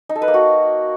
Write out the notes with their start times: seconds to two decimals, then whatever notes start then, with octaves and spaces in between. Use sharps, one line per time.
0.09 D#4
0.16 A4
0.22 B4
0.28 A#3
0.34 F#4